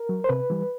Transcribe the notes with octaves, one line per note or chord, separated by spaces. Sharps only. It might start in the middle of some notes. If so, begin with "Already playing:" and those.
Already playing: A#4
F#3
C5
C3 B4
E3 G3